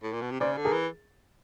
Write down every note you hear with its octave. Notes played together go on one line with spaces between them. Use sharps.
A2
A#2
B2
C3
C#3 C5 D5
D3
G#4 A#4
E3